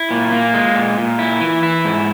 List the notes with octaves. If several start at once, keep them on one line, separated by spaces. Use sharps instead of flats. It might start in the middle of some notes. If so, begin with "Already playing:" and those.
Already playing: E4
A#2
A#3
G#3
A#2
A#2
E4
E3
E4
G#2